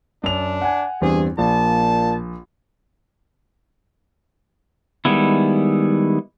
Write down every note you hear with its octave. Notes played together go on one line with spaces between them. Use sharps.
F#2 D4 F7
F#5 G#5
E2 G2 C4 G#4
A#1 A#2 A5
D#3 G3 G#3 B3 E4